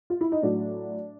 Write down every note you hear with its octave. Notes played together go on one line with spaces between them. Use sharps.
F4
E4
D#4
A2 F#3 D4